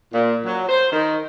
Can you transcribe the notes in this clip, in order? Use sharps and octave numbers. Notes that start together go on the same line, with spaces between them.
A#2
F#3
C5
D#3